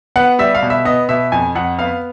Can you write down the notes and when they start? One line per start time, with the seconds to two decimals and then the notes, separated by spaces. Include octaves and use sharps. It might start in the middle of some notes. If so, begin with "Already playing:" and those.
0.16 B3 F#5
0.39 G3 E5
0.55 F5
0.62 B2
0.70 E5
0.85 B3 D#5
1.09 B2 E5
1.32 F2 G#5
1.55 F2 F#5
1.79 B3 F5